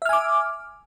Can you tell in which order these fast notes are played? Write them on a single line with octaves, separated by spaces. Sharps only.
E5 F6 G#5 D6